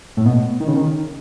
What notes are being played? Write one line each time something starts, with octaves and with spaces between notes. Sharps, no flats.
A2
B2
D#3
C#3
D#3